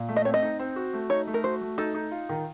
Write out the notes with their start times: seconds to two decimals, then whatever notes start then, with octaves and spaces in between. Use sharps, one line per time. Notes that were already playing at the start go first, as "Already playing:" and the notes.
Already playing: A#2
0.09 A3
0.16 D#5
0.25 C4 C#5
0.34 D#5
0.43 D#4
0.59 C4
0.76 F#4
0.93 A3
1.10 D#4 C#5
1.27 A3
1.34 A#4
1.44 F#4 C5
1.61 A3
1.78 D#4 A4
1.95 D#4
2.11 F4
2.29 D#3